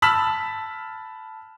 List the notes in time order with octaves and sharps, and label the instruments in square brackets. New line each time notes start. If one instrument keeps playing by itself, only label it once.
[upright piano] A5 B5 E6 F6 B6 F#7